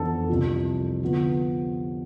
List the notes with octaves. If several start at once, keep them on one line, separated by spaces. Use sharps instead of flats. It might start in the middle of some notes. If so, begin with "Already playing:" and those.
Already playing: F2 E3 B3 D4 A4
C2 C3 F3
D3 F3 B3